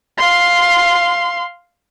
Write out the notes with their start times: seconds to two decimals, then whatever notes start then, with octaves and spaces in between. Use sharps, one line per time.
0.18 F5 C6